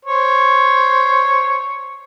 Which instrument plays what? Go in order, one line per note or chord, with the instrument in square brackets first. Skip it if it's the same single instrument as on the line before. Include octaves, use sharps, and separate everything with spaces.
[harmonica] C5 C#5